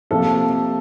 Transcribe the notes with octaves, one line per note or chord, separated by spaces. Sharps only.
C3 F3 A#3 A4